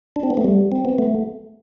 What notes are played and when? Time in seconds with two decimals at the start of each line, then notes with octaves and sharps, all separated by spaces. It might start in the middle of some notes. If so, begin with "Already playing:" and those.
0.16 D4
0.23 C4
0.30 B3
0.37 A3
0.45 G3
0.72 C4
0.85 B3
0.98 A3